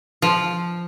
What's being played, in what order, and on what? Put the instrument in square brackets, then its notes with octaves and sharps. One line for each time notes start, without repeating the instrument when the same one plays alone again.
[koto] F3